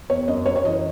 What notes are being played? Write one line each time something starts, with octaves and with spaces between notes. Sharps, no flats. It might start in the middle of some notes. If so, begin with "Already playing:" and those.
E2 C#5
F#2 D#5
F#2 C#5
C#5
E3 D#5